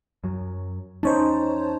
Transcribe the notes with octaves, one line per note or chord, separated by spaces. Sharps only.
F#2 F#3
E2 C#4 D#4 C5 C#5 A5